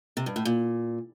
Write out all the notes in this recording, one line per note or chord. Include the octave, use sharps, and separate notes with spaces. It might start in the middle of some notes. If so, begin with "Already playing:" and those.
C3
G2
A2
A#2